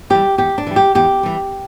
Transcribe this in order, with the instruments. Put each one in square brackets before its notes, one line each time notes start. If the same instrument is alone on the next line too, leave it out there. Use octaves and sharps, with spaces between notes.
[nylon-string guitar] E3 G3 G4
E2 G4
D4
E3 G3
G4
E2 G4
E3 G3